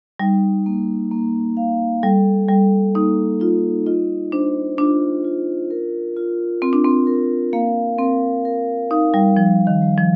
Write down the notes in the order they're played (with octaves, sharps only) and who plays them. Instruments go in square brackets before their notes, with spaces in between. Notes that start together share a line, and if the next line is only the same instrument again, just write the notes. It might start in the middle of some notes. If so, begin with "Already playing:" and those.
[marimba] G3 [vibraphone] D#4
[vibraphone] A#3
A#3
F5
[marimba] G3 [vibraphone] A4
[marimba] G3 [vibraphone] A4
[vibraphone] A#3 [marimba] D#4
[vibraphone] D#4 [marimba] F4
[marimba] F4 [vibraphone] D#5
[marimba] D4 [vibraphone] C5
[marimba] D4 [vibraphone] F4
[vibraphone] F4
A#4
F4
[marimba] C4 [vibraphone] F4
[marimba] D4
C4
[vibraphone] A#4
[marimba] A#3 [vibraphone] F5
[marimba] C4 [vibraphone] A#4
[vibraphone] A#4
[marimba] D#4 [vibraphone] F5
[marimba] G3
[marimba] F3 [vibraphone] G3
[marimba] D#3
[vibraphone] G3
[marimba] F3